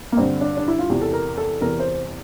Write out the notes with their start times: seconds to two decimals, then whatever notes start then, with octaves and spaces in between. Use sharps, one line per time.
0.12 A#3
0.17 G2 D3 C4
0.41 D4
0.57 D4
0.68 E4
0.79 F4
0.89 E2 C3 E3 G4
1.02 A4
1.13 A#4
1.38 A4
1.61 E2 C3 E3 A#4
1.80 C5